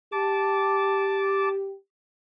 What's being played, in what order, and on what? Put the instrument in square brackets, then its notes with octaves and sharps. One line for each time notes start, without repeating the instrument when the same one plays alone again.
[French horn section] G4 [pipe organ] A5 D6